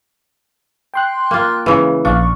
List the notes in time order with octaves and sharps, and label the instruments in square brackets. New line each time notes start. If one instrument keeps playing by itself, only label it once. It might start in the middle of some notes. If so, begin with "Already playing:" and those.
[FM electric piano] G5 C6 F#6
[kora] A#3 F4
[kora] C#3 E3 [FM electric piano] G#3
[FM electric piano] A#1 F5 C#6 [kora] D4